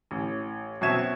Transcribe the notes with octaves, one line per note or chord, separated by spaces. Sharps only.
A1
F#2 B2 C4 E5 G#6 E7